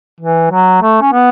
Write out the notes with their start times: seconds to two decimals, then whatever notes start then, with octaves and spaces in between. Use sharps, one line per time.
0.20 E3
0.51 F#3
0.82 A3
1.01 C#4
1.12 B3